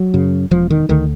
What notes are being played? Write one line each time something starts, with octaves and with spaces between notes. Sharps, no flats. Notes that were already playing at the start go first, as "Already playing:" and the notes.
Already playing: F#3
F#2 C#3
E1 F3
D#3
D2 D3 D#3